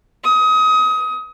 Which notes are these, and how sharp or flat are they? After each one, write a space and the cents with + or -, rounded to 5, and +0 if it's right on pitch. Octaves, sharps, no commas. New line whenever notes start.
D#6 +25